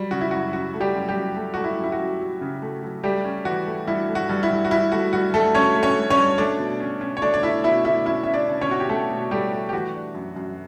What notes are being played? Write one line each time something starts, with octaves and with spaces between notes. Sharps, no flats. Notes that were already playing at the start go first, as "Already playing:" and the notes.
Already playing: F#3 G3
C#3 F#4
E4
F#2 F#4
F#2 F#4
A3
G3 G4
F#2
G3 G4
F#2
A3
A3 F#4
E4
F#2
E4
F#4
F#2
F#3
C#3
A3
F#3
G3 A3 G4
C#4
E3 F#4
A3
G2 E4
A3
F#4
G2
E4
G2
F#4
G2 E4
A3 F#4
G2 F#4
G2 A3 A4
C#4 C#5
A3
C#4 C#5
A3
C#4 C#5
G2
A3 D4 D5
B2
C#4
C#4
C#5
A3 D4 D5
D5
A3 E4 E5
B2 E4 E5
A3 E4 E5
C#4 E4 E5
C#4 E5
D4 D5
C#4
C#4 C#5
B2 F#4
G4
A3 C#4 A4
B2
G3 A3 G4
A3
G4
E3 F#4
D4
F#2
F#2